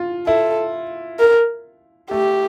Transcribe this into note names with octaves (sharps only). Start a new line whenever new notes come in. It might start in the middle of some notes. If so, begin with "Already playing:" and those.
Already playing: F4
E4 A4
A#4
A3 G4